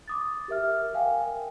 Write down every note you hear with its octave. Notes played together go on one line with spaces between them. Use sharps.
D6 D#6 A6
G4 A#4 E5 F6
A#4 F5 G5 G#5